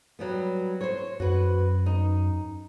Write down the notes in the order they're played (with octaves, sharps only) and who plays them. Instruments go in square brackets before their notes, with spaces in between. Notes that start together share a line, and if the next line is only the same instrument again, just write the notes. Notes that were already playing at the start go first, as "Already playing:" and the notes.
[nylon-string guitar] F#3 G3 B3
C5 C#5
[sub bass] F#2 [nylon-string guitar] F#4 B4
[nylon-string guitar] D#4